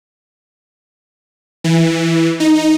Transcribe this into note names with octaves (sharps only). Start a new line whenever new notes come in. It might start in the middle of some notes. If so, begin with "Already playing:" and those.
E3
D#4